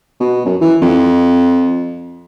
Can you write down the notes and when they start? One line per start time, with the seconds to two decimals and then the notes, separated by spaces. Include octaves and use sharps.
0.20 B2
0.46 F#2
0.61 E3
0.82 F2